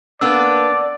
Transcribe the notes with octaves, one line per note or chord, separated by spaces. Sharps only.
A#3 B3 D4 D5 E6